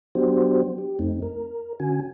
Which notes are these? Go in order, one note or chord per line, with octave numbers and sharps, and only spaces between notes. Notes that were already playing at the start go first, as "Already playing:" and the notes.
F#3 B3 D4 F#4 G4 C5
G4
F2 A3 C4 D#4
A#4
D3 C#4 F#4 G#5